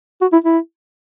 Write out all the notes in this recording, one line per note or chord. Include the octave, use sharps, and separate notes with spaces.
F#4
E4
E4